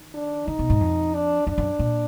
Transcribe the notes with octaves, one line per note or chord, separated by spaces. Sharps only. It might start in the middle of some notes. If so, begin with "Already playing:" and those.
Already playing: D#3
D4
D3 D#4
B2
G#2
F2
D4
F#2 D4
F#2
A#2